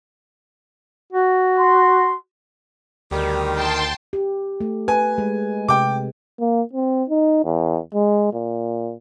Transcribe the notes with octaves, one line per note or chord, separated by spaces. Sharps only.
F#4
C6
D2 D#3 G3 G4
G5 A5 C6
G4
A3
B4 G#5
G#3
C3 G5 D6
A#3
C4
D#4
E2
G#3
A#2